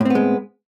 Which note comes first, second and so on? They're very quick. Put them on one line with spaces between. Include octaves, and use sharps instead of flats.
A2 C4 B3 G#3